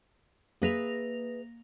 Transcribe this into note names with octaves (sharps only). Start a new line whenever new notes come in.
A#3 G#4 B4 E5 A#6 F7